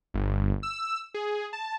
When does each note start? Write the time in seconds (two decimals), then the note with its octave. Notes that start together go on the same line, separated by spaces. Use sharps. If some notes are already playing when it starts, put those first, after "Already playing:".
0.14 G1
0.63 E6
1.14 G#4
1.53 A5